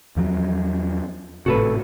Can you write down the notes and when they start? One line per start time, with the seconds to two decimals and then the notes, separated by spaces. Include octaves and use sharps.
0.16 E2 F3 F#3
1.46 G#1 A2 C3 F#4 A4 B4